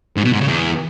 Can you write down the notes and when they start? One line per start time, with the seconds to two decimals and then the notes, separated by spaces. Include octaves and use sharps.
0.16 G#2
0.24 B2
0.32 G#2
0.40 C#3
0.48 E2